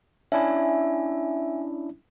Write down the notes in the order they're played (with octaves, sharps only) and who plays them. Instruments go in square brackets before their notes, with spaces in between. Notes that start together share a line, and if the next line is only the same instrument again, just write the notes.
[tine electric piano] C#4 D4 E4 [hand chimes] E5 G#5